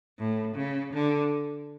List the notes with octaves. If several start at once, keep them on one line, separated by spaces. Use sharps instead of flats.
A2
C#3
D3